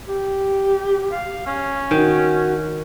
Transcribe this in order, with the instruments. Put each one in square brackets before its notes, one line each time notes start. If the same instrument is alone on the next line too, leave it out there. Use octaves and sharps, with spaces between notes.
[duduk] G4
[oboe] F5
C#4
[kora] D#3 [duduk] F#4